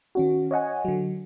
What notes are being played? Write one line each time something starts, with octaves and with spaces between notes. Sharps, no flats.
D#3 C#4 F#4
C#5 D#5 F#5 G#5
D3 F#3